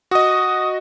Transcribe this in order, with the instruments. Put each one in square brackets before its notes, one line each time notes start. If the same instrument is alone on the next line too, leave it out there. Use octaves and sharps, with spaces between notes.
[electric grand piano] F#4 D#5 [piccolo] D#6